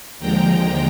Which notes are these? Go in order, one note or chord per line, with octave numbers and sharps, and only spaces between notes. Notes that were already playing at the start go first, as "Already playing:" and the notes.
D#2 D3 F3 G#3 G5 A#5